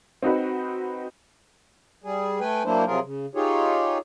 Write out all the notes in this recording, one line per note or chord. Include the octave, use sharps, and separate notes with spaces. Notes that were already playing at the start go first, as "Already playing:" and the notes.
C4 D#4 F#4 B4
G3 G#4
A3 B4 G5 G#5
F#3 A#3 D4 E4 C5
C3 F3 F#3 F4 G#4 A#4
C#3
D#4 F4 G4 G#4 C#5